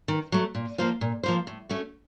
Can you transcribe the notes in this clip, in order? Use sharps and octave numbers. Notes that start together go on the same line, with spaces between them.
D#3
F#3 A3
A#2
F3 A#3 F4 C5
A#2
F3 A#3 F4 C5
A2
A3 C#4 F#4